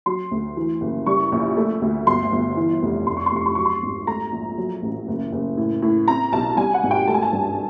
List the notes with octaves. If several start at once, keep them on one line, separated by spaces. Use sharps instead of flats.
F#3 C6
D2
E3
F#1
G3 C#6
A#1
A3
D2
G1 C6
G1
E3
F1
F1 C6
C#6
C6
F1 C#6
C6
F#3 C#6
C6
G#1
A3 A#5
A#1
F#3
A1
F#1
F#1
A2
A2
C4 A#5
B1 A5
G3 G#5
F#5
G#1
G5
A3 A5
G#5
A5
G2